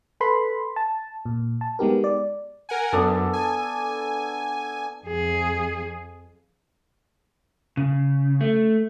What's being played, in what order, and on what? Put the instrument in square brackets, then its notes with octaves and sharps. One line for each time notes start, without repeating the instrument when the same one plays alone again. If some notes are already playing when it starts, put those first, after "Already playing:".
[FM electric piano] A4 B4 B5 C6
A5
A#2
A5
G#3 B3 D#4 G4 A#4
D5
[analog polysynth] A#4 F#5 G#5
[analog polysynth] F#2 [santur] B3 D4 A4
[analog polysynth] G#5
[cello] F2 G#4
[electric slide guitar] C#3
A3